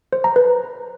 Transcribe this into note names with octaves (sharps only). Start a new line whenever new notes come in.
C5
A#5
B4